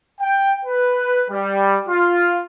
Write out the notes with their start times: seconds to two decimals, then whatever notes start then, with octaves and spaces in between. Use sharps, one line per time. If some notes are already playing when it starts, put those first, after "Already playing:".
0.21 G5
0.65 B4
1.30 G3
1.89 F4